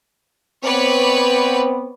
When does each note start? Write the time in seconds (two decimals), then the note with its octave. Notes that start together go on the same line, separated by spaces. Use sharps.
0.64 B3 C4 B4 C#5 D5